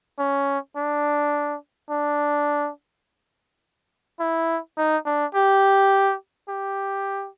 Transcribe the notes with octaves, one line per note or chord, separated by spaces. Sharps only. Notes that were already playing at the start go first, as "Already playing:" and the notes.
C#4
D4
D4
E4
D#4
D4
G4
G4